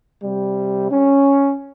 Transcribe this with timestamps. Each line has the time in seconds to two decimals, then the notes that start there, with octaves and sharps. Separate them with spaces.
0.22 C3 G3
0.91 C#4